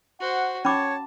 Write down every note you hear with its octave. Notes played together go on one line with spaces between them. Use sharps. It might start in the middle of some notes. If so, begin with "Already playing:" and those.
F#4 C5 F#5
C#4 C#5 A5 B5 D6